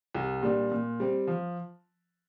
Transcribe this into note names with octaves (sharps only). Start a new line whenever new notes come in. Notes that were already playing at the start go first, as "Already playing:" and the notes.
C2
A#2 G3 D4
A#2
G3 C4
F3